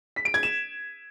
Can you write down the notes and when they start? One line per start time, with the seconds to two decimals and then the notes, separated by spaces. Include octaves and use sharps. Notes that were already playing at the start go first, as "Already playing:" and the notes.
0.16 B6
0.25 D7
0.34 G#6
0.43 E7